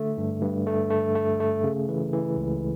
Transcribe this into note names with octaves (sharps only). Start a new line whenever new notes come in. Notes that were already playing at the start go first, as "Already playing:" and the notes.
Already playing: D3 A3
G2
G2
A3
A3
A3
A3
C#3
E3
E3
C#2